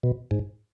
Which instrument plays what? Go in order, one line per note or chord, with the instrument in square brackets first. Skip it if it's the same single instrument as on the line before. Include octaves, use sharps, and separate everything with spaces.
[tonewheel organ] B2
G#2